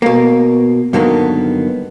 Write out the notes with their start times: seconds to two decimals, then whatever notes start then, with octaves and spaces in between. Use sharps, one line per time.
0.02 B2 A#3
0.93 G2 D3 D#3 F#3 A#3 B3